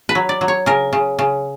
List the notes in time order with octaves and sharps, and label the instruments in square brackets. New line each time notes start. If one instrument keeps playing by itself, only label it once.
[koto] B4
F#3
D5
F#3
C#5
C#3 A#4
C#3
C#3